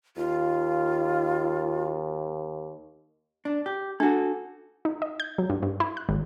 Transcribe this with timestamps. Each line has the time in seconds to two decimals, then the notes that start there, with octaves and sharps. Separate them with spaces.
0.17 D#2 F4
3.45 D4
3.66 G4
4.00 D4 F#4 A4
4.85 D#4
5.02 D#5
5.20 G6
5.38 F#3
5.50 G2
5.62 G2
5.80 E4
5.97 F#6
6.09 G#1